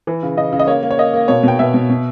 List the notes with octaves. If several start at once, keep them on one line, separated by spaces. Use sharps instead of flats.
E3
C#3
C#3 D#5
C#3
D#5
A#3 C#5
A#3
C#5
A#3 D#5
A#3
B2 C#5
B2 G5
B2 E5
B2
B2